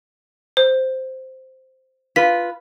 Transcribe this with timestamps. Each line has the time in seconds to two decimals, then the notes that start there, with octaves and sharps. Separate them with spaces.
0.57 C5
2.16 F4 B4 B6